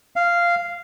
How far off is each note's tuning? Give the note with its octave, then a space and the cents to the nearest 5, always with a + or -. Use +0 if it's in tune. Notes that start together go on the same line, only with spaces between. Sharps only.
F5 -10